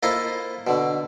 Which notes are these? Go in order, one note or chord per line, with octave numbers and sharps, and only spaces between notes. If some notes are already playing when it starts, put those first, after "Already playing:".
A#3 E4 F4 A4 C5 D#5
B2 D3